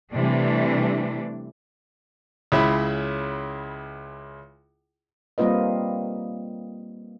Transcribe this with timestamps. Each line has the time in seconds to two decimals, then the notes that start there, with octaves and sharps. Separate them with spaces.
0.13 C3 E3 G3 A3 D4
2.52 C#2 C#3 E4 B5
5.38 G3 A#3 C4 F4 B4 D#5